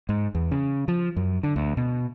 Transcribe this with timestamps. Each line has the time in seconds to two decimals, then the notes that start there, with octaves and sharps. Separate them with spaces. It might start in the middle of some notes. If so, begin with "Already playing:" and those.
0.09 G#2
0.35 E2
0.51 C#3
0.88 F3
1.16 F#2
1.43 D3
1.56 D2
1.77 B2